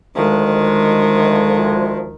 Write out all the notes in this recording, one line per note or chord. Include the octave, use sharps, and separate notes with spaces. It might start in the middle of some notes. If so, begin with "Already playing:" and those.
D2 D#3 F3 G#3